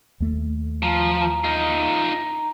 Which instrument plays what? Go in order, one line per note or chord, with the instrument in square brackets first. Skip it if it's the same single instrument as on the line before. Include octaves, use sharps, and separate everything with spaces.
[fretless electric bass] D#2 A3
[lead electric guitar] F3 [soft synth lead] A#5
[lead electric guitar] D#4 F4